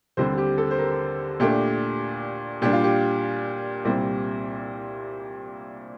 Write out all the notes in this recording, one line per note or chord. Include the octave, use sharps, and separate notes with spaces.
D#2 D3 G3 C4 C5
G4
A4
C5
A#4
A#2 A3 D4 G4
A#2 G3 D4 G4
F4
G4
C2 A#2 G3 C4